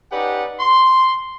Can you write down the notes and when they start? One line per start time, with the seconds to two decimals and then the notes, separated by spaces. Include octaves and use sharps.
0.12 C#4 D#4 G4 B4 D5 F#5
0.60 C6